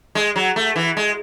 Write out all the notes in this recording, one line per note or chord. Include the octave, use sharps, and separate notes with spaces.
G#3
F#3
A3
E3
G#3